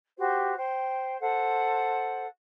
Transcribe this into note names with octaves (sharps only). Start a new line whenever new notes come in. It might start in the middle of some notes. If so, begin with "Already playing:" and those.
F#4 G4 C5
C5 G5
A4 C5 F#5